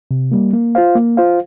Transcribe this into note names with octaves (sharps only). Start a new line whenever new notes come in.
C3
G3 A#3
A#3
F4 C5 F5
A#3
F4 C5 F5